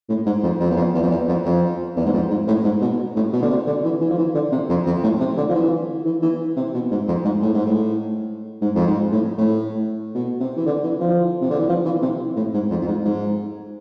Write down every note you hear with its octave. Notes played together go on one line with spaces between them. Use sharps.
A2
G#2
F2
F2
E2
F2
E2
F2
E2
F2
F2
E2
G#2
F2
G#2
A2
G#2
B2
A2
B2
D3
C3
D3
E3
E3
F3
E3
D3
C3
F2
F2
A2
C3
D3
F3
E3
E3
E3
C3
B2
G#2
F2
G#2
A2
G#2
A2
G#2
F2
G#2
A2
A2
B2
C3
E3
D3
E3
F3
C3
D3
E3
F3
E3
C3
A2
G#2
F2
F2
G#2
G#2